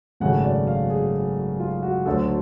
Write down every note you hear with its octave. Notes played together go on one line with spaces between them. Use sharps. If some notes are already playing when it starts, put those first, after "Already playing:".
G#1 F#2 C#3 F#3 A3 F#5
D5
F5
G#4
F4
F#4
D2 D3 F#3 A3 A4